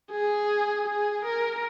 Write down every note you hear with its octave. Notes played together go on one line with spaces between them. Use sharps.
G#4
G#4
A#4